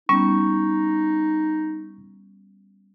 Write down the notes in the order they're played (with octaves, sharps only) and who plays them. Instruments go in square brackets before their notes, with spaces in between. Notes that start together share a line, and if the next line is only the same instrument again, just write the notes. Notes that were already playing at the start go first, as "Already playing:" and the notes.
[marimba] G3 B3 C#4 [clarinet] D#4 [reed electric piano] C#6